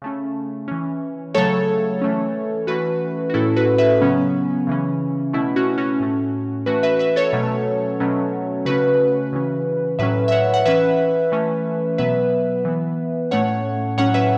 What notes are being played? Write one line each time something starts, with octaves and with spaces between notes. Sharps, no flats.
C#3 A3 C#4
E3 C#4
C#3 F#3 A3 A4 C#5
E3 A3 C#4
E3 A3 C#4 F#4 B4
F#4
A2 A3 C#4 E4 A4
F#4 B4
B4 E5
C#3 F#3 B3 C#4
C#3 E3 C#4
B2 A3 C#4 E4
C#4 F#4
C#4 F#4
A2 A3 C#4
E3 A3 C#4 F#4 B4
B4 E5
B4 E5
A4 C#5
B2 F#3 A3 C#4
B2 F#3 A3 C#4
C#3 A3 C#4 F#4 B4
C#3 E3 C#4
A2 F#3 C#4 B4 E5
E5
C#5 F#5
F#5
E3 C#4 B4 E5
E3 A3 C#4
B2 F#3 B3 B4 E5
E3 B3
A2 A3 C#4 C#5 F#5
A2 F#3 C#4 C#5 F#5
B4 E5